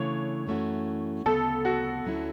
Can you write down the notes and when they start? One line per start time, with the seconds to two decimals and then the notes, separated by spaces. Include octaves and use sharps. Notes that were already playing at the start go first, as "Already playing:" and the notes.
Already playing: C#3 E3 A3 D4 C#5
0.47 F#2 E3 A3 C#4 F#4
1.25 D2 C#3 F#3 B3 A4
1.65 F#4
2.04 D2 D3 F#3 C#4 E4